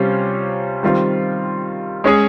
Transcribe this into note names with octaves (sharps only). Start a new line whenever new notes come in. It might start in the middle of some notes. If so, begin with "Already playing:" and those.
Already playing: C3 G3 C#4 F4 C5
D#3 G3 C4 F4
G#3 C#4 G#4 C#5